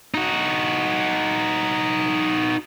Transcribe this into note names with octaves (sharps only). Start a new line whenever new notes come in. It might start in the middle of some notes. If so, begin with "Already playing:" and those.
D#4 F#4